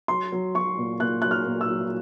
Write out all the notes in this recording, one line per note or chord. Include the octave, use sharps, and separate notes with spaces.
F#3 C6
F#3
F#3 C#6
A#2
A#2 F#6
F#3 F#6
F6
A#2
E6
F#3